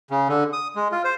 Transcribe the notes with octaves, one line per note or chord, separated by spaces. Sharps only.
C#3
D3
D#6
G#3
F4
C5